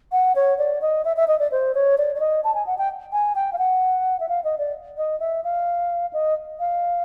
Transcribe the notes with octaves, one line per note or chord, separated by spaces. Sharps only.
F#5
C#5
D5
D#5
E5
E5
D#5
D5
C5
C#5
D5
D5
D#5
A5
G#5
F#5
G5
G#5
G5
F5
F#5
E5
F5
D#5
D5
D#5
E5
F5
D#5
F5